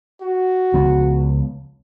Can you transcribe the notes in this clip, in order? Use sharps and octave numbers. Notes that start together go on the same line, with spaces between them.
F#4
C#2 F3 B3